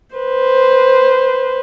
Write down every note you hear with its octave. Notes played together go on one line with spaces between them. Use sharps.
B4 C5